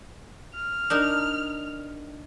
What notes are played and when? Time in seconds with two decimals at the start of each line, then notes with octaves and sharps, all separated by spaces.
0.55 F6
0.90 D4 D#4 A#4